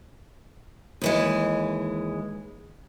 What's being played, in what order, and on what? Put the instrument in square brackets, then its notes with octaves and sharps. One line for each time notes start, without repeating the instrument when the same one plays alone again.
[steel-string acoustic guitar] D#2 E3 G#3